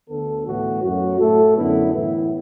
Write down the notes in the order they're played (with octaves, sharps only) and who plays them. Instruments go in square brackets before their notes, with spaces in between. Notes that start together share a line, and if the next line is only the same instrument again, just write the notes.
[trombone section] D2 D3 B3 A4
A2 E3 B3 F#4
F#2 F#3 A3 F#4
A2 A3 A4
F#2 D3 B3 E4
A2 E3 B3 E4